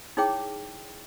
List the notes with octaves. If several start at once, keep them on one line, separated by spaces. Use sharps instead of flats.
D#4 E4 G#4 C#5 G5 D6